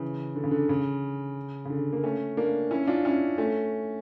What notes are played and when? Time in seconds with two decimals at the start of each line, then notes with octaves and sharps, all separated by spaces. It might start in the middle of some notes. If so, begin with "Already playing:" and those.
Already playing: C#3 E3
0.36 D3
0.44 C#3
0.51 D3
0.69 C#3
1.65 C#3
1.70 D3
1.93 A#3
2.04 A3 C#4
2.37 A#3 D4
2.71 C#4 E4
2.88 D4 F4
3.05 C#4 E4
3.38 A3 C#4